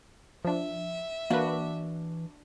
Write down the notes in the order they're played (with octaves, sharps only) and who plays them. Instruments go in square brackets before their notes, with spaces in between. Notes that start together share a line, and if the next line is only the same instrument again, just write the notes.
[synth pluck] F3 D4 [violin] E5
[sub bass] E3 [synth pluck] A#3 B4 [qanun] D4 F#4